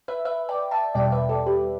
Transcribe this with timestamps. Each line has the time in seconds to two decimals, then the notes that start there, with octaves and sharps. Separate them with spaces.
0.08 B4 E5
0.25 B4 E5
0.49 D5 G5
0.71 E5 A5
0.94 E2 B2 G3 D5 G5
1.12 B4 E5
1.29 A4 D5
1.46 G4 B4